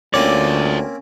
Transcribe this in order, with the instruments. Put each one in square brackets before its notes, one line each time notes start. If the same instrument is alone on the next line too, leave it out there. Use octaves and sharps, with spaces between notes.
[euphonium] D2 [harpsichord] A#3 C4 C#4 [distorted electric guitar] F4 C#5 [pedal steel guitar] D5